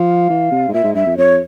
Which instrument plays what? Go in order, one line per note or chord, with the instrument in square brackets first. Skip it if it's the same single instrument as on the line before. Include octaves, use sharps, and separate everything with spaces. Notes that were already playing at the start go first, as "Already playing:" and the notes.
Already playing: [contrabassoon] F3 [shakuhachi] F5
[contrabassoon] E3
C3
G#2
[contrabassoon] A#2 [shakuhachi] E5
[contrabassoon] G#2
[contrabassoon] G2 [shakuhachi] E5
[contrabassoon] F2
[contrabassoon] F2 [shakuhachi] C#5